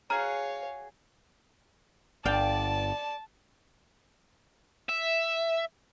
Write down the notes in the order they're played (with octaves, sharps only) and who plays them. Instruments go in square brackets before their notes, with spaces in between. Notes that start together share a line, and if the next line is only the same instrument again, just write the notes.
[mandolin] F#4 G#4 [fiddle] C#5 F5 [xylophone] A#5 F6
[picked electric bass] G1 [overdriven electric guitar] D5 [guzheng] F5 G5 [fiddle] A5
[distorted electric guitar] E5